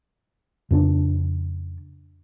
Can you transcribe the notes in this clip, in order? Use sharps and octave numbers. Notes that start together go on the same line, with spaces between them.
F2 C#3 C#4 D4